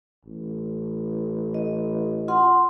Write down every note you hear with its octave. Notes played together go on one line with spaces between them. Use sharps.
A1
D#5
F4 F#5 C6